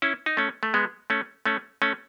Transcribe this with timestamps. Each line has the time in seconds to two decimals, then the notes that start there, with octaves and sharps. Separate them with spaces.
0.02 C#4 E4
0.26 D#4
0.37 A3 C#4
0.63 A3
0.74 G#3 B3
1.10 A3 C#4
1.46 A3 C#4
1.82 A3 C#4